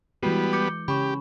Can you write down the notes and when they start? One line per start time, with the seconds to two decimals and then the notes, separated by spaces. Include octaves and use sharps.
0.23 E3 G3 G#3 B3 F#4
0.53 D6 G6 C#7
0.88 C#3 C#4 G4 B5 C#6